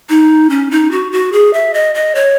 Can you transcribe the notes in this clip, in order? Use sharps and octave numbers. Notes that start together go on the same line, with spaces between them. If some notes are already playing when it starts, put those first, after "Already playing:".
D#4
C#4
D#4
F#4
F#4
G#4
E5
D#5
D#5
C#5